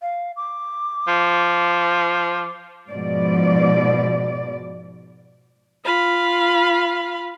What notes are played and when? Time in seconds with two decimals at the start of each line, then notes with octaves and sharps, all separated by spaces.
0.02 F5
0.36 D6
1.08 F3
2.89 G#2 B2 F3 D5
5.83 F4 F5 B5